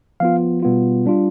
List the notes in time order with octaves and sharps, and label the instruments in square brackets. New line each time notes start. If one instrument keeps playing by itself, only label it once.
[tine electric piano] F3 B3 F4 F5
B2 G3 B3 F4
G3 D4 F4